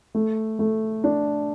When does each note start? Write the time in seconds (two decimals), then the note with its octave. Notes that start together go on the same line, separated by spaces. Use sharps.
0.15 A3
0.59 A3
1.04 D4